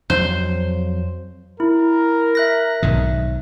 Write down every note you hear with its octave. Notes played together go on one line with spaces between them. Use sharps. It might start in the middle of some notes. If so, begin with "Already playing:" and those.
F2 F#3 C5
E4 A#4
E5 F#6 A#6
B1 G#2 D#3